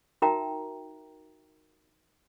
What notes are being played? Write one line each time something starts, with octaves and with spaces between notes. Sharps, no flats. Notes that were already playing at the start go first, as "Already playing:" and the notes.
D#4 F#4 A#4 E5 G5 A#5